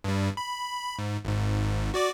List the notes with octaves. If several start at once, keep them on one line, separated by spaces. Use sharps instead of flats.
G2 G3
B5
G#2
G#1 G#2
F#4 D5 D6